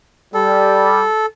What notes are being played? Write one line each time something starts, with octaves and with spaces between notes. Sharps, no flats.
G3 A4